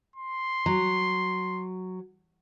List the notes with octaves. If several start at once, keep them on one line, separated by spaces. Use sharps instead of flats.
C6
F#3